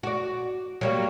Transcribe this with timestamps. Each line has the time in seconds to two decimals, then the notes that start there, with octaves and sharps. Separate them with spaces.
0.03 F#4 D5
0.81 F#3 G3 A#3